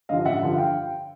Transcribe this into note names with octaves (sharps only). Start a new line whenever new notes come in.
G2 D3 F3 D#5 F5
A1 E5 F#5
G2 D3 F3
F5 G5